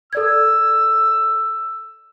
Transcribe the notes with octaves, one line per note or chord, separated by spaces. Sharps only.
A4 D5 E6 G#6